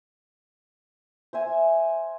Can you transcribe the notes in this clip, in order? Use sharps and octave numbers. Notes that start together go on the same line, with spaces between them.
C5 E5 G#5